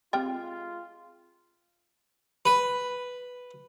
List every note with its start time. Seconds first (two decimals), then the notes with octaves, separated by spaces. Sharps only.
0.13 G#3 C4 F4 G4 G5 F6 A6
2.45 B4